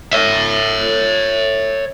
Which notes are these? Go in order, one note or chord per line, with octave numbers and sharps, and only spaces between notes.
C#5 E5